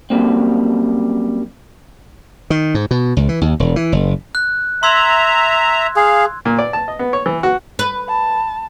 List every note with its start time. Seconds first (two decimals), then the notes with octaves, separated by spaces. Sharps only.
0.10 F#2 E3 G3 A#3 C4
2.50 D#3
2.75 G#2
2.91 B2
3.17 C#2
3.29 E3
3.41 D#2
3.60 E1
3.76 E3
3.92 F#1
4.35 F#6
4.83 E5 A#5 C6 E6 G#6
5.96 G#4 F5
6.45 A#2
6.59 D5
6.73 A5
6.88 D#5
6.99 B3
7.13 C#5
7.26 E3
7.43 F#4
7.79 B4
8.08 A5